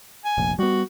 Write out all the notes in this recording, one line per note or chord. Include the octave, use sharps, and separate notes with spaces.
G#5
F1 A#1
G3 B3 F#4